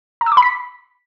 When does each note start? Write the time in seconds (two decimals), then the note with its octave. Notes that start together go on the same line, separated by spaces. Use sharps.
0.21 A#5
0.26 E6
0.32 D6
0.37 B5
0.42 B6